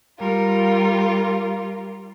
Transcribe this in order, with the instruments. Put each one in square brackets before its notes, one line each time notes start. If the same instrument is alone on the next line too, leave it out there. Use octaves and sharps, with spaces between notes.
[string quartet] G3 F4 A#4